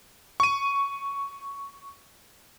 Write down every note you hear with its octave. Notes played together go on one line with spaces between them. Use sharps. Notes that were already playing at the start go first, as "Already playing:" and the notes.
C#6 D#7